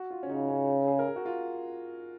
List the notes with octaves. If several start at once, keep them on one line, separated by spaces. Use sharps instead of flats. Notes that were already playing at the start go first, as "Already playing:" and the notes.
Already playing: F#4
F4
C#4
C#3 D#4
C#4
G#4
A#4
G#4
F#4
F4